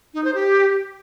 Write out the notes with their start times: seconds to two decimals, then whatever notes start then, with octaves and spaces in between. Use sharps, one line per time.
0.14 D#4
0.24 C5
0.35 G4